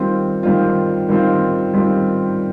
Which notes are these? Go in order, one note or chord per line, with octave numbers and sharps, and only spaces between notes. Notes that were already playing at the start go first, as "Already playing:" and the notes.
Already playing: D#3 G3 C4 F4
D#3 G3 C4 F4
D#3 G3 C4 F4
D#3 G3 C4 F4